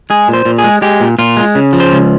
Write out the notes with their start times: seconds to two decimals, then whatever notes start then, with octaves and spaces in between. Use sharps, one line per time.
0.10 G#3 G#4
0.28 A#2
0.33 C5
0.45 A#2
0.58 G#4
0.64 G#3
0.82 G#3 G4
1.01 A#2
1.19 A#2 F4
1.37 G#3
1.55 C#3
1.73 F3
1.80 C5
1.92 C#2